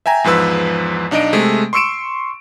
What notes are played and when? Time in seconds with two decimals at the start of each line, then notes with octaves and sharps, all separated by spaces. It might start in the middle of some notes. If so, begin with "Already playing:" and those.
0.06 E5 G5 G#5 A#5
0.24 E2 G#2 F3 B4 E6
1.11 B1 D4 D#4 D#5 D7
1.33 C3 G#3 A3
1.73 C6 C#6 E6 C#7 D7 E7